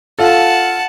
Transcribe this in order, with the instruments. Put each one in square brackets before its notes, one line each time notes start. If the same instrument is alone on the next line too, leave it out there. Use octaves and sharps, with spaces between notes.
[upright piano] F4 A4 [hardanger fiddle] F#5 A5